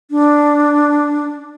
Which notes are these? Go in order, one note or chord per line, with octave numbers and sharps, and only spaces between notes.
D4